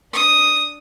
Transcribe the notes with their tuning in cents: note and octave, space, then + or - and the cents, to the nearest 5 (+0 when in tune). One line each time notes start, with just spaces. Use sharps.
D4 +0 D#6 +0